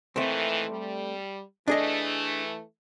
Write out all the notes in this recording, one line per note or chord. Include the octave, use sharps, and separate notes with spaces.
A#2 D#3 E3 A3 C4
G3
E3 A3 D4 G#4 D#5